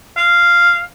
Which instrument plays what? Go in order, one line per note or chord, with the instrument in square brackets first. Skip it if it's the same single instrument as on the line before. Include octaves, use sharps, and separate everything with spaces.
[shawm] F5